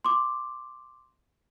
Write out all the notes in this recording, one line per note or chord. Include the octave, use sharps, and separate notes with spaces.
C6 D6